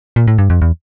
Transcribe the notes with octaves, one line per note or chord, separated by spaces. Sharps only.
A#2
A2
G2
F2
E2